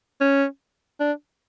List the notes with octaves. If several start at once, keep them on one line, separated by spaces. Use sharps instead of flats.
C#4
D4